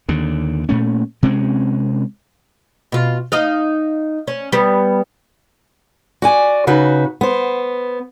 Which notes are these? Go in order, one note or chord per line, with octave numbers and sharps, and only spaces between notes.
D#2 D3
A#2 A3 C#4
C3 G#3 C4 C#4
B2 F4
D#4 D#5 F5
C#4
G3 B3
F#4 D5 G#5
C#3 D#4 F#4 B4
B3 C5